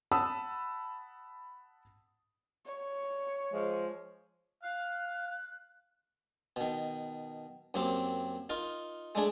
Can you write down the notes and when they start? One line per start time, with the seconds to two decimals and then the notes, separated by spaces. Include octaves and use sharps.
0.12 F#5 A5 B5 D#6 E6
2.65 C#5
3.51 F3 G#3
4.63 F5 F#6
6.56 B2 D#3
7.74 F#2 A#3 C4 G4
8.49 D#4 F4 A#4
9.15 G#3 A3 D4 G#4